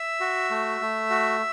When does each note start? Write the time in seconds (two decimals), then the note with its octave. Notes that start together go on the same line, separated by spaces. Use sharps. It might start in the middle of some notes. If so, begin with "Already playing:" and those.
Already playing: E5 E6
0.21 F#4
0.51 A3
0.81 A3
1.10 F#4